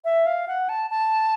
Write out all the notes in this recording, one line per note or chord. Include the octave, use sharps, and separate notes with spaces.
E5
F5
F#5
A5
A5